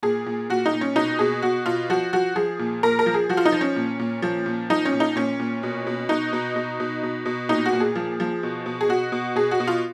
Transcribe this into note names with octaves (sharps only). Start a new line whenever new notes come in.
A#2 G#4
A#2
A#2 F#4
D#4
A#2
C#4
B2 D#4
B2 G#4
B2 F#4
B2 F4
F3 F#4
F3 F#4
F3 G#4
A#2
A#2 A#4
A#4
F3
G#4
F3 F#4
F4
D#4
F3
C#4
A#2
A#2
F3
A#2
F3 D#4
C#4
A#2
D#4
A#2 C#4
A#2
B2
B2
B2 D#4
B2
B2
B2
B2
B2
A#2 D#4
F#4
A#2
G#4
F3
F3
B2
B2
G#4
B2 F#4
B2
B2 G#4
F#4
B2
F4